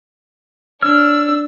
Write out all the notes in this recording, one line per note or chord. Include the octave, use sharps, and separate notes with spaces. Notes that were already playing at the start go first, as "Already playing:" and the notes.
D4 C#5 E6 F6